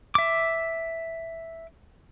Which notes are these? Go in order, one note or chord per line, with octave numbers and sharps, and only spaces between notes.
E5 D6